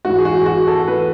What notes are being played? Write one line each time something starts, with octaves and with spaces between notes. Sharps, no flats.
G#2 E3 F#4
G#4
F#4
F#4
A4
E3 B4